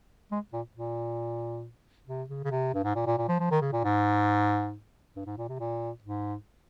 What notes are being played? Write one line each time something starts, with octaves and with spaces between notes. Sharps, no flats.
G#3
A#2
A#2
C3
C#3
C#3
C3
G2
G#2
A#2
A#2
A#2
F3
F3
D#3
C#3
A#2
G#2
G2
G#2
A#2
C3
A#2
G#2